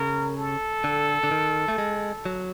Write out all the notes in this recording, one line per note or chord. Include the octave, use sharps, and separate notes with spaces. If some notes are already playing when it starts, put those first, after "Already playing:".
Already playing: C#3 A#4
A4
D3
D3
D#3
A3
G#3
F#3